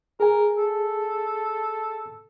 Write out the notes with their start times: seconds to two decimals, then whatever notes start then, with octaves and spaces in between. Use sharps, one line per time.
0.20 G#4 A#4 G#5
0.58 A4